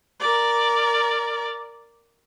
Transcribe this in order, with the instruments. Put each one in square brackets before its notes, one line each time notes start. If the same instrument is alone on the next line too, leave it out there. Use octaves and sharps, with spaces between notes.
[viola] A#4 D5